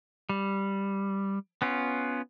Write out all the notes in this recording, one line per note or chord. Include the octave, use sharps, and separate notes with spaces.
G3
B3 C#4 F4